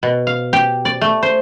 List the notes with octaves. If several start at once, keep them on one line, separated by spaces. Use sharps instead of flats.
B2
F5
G4
D5
A3
C5